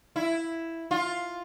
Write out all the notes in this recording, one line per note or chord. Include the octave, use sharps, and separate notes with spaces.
E4
F4